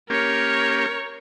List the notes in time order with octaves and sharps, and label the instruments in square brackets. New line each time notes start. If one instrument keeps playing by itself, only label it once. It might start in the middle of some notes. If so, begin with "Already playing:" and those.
[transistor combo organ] A#3 C#4 G4 [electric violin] A#4 C#5